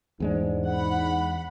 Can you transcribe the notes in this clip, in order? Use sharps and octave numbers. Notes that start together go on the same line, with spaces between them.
E2 G#2 G#3 D4
F#5 B5